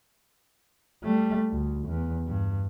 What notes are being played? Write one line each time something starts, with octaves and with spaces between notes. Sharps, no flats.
G3 A3
D2
E2
G2